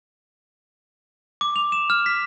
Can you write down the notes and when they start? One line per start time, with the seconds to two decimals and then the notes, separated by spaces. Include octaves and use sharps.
1.41 D6
1.56 F7
1.72 E7
1.90 F6
2.06 B6